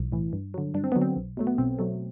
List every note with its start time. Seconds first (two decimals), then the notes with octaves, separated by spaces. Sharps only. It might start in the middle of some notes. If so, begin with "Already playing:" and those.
Already playing: B1 E3
0.12 A2 E3
0.33 G2
0.54 D3 F#3
0.74 G2 D4
0.84 C4
0.92 B3
0.96 D3 F#3
1.02 C4
1.17 B1
1.37 B2 F#3 A3
1.47 B3
1.58 B1 C4
1.79 B2 F#3 A3